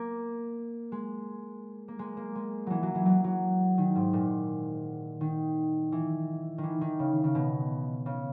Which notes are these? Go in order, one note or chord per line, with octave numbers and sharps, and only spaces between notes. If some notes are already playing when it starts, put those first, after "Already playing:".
Already playing: A#3
G#3
A#3
G#3
A#3
G#3
E3 F#3
F#3
E3
F#3
F#3
D#3
G#2
A#2
D#3
E3
D#3
E3
D#3
C#3
C#3
B2
C#3